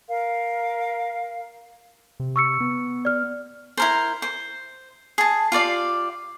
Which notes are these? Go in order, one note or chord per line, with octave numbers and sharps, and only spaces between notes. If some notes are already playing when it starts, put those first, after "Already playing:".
A#4 F5
C3
C#6 E6 C#7
B3
D5 F6
E4 A#4 C5
C5
G#4 A5
F4 G4 D5 F5